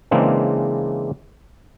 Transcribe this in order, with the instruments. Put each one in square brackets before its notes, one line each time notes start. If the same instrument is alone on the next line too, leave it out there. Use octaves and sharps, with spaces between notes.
[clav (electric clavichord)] C#3 E3 G#3 A#3 C4 D4